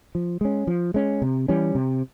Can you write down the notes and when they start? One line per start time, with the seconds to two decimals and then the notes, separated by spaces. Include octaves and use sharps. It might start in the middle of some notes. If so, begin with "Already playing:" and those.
0.15 F3
0.41 G#3 C#4
0.67 F3
0.94 G#3 C#4
1.22 C3
1.48 E3 G3 C#4
1.75 C3